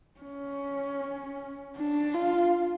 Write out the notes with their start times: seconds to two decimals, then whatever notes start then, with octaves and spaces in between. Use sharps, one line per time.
0.21 C#4
1.76 D4
2.14 F4